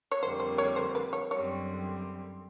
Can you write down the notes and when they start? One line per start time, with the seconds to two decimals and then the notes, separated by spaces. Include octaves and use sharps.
0.12 C#5
0.22 F2 D3 G3 A#3 C5
0.40 C5
0.58 C#5
0.76 C5
0.95 B4
1.13 C#5
1.31 F#2 D3 G3 C4 C#5